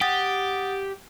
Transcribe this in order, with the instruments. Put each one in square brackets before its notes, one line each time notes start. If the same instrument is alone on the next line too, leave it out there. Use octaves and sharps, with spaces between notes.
[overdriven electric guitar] G4 [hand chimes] F#5 D#6 A6